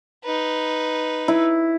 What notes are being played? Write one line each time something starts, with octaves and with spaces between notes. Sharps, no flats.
D#4 B4
E4